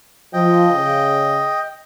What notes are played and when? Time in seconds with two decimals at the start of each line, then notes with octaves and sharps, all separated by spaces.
0.33 F3 D#5 G5
0.70 C#3